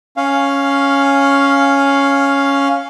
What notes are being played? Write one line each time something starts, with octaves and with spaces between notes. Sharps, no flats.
C#4 F5